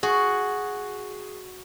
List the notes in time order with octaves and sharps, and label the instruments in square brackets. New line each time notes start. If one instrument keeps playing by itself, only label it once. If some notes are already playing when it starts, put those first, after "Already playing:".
[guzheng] F#4 [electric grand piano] G#4